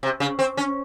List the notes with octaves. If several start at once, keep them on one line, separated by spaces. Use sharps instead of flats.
C3
C#3
C4
C#4